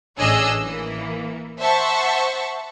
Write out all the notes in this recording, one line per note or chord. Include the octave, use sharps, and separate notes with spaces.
A1 D4 G#4 C#5 D#5 E6
E3 A#3
C5 E5 F#5 A5 C#6